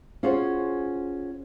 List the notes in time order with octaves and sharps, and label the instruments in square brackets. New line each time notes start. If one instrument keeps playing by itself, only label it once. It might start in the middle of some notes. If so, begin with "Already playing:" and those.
[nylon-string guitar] C#4 F4 F#4 G#4 C5 C#5